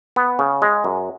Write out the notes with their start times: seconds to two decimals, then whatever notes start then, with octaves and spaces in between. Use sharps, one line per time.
0.16 B3
0.39 C#3
0.62 G#3
0.84 F#2